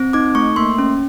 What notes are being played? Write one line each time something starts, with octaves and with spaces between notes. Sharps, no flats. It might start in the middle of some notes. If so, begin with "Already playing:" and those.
Already playing: C4
D#4 D6
A3 C#6
A#3 C6
C#4